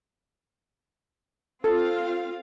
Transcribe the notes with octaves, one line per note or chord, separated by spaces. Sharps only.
C4 F4 A4 F5